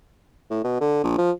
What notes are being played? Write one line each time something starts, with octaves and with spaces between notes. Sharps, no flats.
A2
B2
D3
A#1
F3